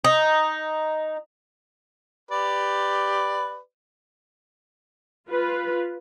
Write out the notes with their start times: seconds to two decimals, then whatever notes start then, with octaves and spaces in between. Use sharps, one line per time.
0.04 D#4
2.31 G4 B4 D5
5.29 F4 B4